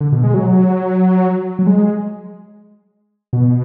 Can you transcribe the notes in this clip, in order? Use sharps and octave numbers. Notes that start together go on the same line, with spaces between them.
D3
B2
G#3
F#3
F#3
G#3
B2